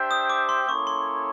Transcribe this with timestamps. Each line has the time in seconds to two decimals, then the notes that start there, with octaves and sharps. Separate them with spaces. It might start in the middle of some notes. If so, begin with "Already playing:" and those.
Already playing: D4 G4 C5 E5 G5
0.11 D#6
0.30 D6
0.49 C6
0.68 A#3 C#4 E4 A4 C#5 C#6
0.87 C6